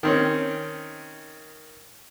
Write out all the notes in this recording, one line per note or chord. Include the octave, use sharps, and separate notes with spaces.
D#3 C4 C#4